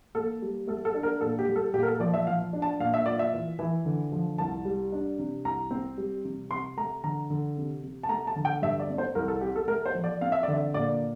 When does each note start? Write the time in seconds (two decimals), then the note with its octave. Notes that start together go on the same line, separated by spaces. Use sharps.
0.15 A#3 A4
0.42 G3
0.67 A3 A4
0.85 A4
0.94 D4
1.03 A#4
1.21 A#2 A4
1.39 G4
1.47 G3
1.56 A4
1.73 A#2 G4
1.83 A#4
1.87 A4
2.00 F3 D5
2.14 E5
2.27 F3 F5
2.53 D4
2.62 A5
2.80 A#2 F5
2.94 E5
3.06 F4 D5
3.19 E5
3.33 E3
3.59 E3
3.85 D3
4.12 F3
4.38 C2 A5
4.65 G3
4.92 D4
5.19 C3
5.44 C2 A#5
5.71 C4
5.98 G3
6.25 C3
6.50 C3 C6
6.77 A3 A#5
7.04 D3 A#5
7.30 D3
7.57 C3
7.83 C3
8.03 A5
8.09 A3 A#5
8.27 A5
8.36 D3
8.45 G5
8.62 G2 E5
8.79 D5
8.89 C4
8.98 C5
9.15 C2 A#4
9.28 A4
9.41 C3 G4
9.56 A4
9.68 A3 A#4
9.86 C5
9.95 F3
10.04 D5
10.21 C4 F5
10.32 E5
10.43 D3 D5
10.54 E5
10.74 A#2 D5